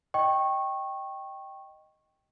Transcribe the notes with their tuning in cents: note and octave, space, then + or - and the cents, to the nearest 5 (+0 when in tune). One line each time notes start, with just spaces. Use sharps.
D#5 +0 G5 -5 C#6 -20